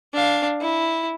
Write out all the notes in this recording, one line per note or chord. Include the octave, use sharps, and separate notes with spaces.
D4 F5
E4